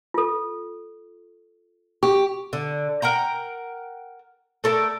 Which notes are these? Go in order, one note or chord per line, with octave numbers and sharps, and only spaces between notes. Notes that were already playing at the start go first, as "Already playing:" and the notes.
F4 A4
G4 C#6
D3
A#4 F#5 G5 A#5
A3 A4 A#4 D5